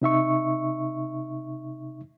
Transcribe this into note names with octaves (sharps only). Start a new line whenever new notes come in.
C3 D#4 E5 C#6